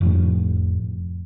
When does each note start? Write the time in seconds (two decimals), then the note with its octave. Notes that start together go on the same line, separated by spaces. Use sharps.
0.01 F1 F2 A2